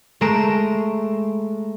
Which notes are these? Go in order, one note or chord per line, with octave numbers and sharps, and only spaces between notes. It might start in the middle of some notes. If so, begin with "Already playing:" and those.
G#3 A3 A#5 C7 D7 E7